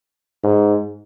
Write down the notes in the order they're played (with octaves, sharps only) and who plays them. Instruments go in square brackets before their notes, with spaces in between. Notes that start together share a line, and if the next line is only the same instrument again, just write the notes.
[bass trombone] G#2